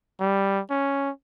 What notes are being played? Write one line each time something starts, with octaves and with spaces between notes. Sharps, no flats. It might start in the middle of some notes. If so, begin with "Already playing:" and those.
G3
C#4